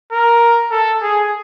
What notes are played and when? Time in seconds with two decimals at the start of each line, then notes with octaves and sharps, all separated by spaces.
0.12 A#4
0.71 A4
1.02 G#4